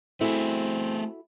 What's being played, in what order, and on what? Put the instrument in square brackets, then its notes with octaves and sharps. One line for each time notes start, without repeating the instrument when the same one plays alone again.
[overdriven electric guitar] A3 G#4 [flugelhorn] C4 [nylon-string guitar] E4 F#4 A4